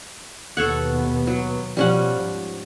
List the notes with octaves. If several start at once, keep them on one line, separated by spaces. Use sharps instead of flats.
D#2 B2 B3 A4 C#5 F#5
F#3
B2 F3 G3 C#4 F#5
G#2